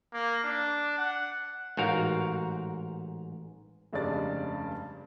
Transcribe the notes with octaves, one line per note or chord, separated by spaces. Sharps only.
A#3
D4
F#5
A1 G#2 F#4 A#4 F5
F1 G2 C#3 G#3 D5 A6